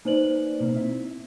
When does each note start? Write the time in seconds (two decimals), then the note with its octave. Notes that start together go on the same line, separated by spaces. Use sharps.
0.05 A#3 D#4 B4 C5 D5 F#7
0.60 B2 A#3 C4
0.72 C4 E4 E5